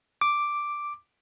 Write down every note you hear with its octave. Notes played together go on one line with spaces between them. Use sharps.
D6